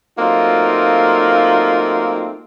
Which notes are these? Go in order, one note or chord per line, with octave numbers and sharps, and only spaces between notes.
F#3 A3 A#3 C4 D#4 F4